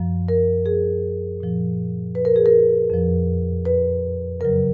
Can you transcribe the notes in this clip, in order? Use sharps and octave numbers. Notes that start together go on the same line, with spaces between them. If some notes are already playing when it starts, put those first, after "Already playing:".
Already playing: F#2 F3
A#4
G#4
A#2 F3
B4
A#4
G#4
A#4
F2 F3
B4
F#2 C#3 F#3 A#4